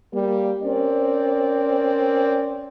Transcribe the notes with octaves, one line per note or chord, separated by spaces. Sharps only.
G3 A#3
C4 C#4 A#4 D5